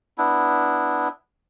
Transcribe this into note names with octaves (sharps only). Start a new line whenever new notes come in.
B3 D4 E4